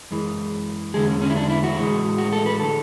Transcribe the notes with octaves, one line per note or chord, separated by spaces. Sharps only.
F#2 E3 G#3
E2 D3 G#3 G#4
C#4
C#4
E4
D4
E4
F#4
A2 E3 G#3
F#4
A4
B4
D3 F#3 A4